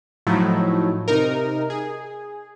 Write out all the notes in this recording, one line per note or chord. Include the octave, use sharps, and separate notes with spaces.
A2 F3 F#3 A3 D#4 E4
C3 D#4 A#4
G#4